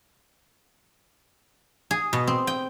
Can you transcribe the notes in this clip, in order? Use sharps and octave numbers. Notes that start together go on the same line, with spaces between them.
G#4
B2
C4
G5